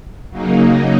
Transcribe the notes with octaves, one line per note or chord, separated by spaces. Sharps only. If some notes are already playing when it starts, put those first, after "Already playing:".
C#3 F#3 A#3 D#4